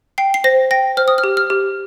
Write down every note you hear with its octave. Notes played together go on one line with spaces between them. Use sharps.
G5 C7
C7
C5 A#6
G5 A#6
C5 F6
D#6
F6
G4
F6
G4